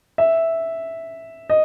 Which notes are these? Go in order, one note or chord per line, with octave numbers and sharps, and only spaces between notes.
E5
D#5